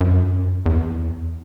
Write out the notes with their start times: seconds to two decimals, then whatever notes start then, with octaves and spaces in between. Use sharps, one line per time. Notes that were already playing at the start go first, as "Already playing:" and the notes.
0.01 F#2
0.66 E2